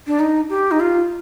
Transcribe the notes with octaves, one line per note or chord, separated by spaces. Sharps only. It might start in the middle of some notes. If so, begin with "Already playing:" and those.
D4
D#4
G4
D#4
F4